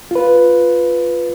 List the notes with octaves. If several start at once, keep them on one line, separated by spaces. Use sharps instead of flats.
F4 B4